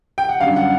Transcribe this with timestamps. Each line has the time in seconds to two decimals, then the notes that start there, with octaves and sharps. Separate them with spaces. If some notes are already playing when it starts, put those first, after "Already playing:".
0.18 G5
0.29 F#5
0.40 F#2 D3 G3 F5
0.56 F#5